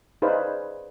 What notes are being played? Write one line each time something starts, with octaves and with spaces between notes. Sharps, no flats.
D#4 G#4 B4 C5 D5 F5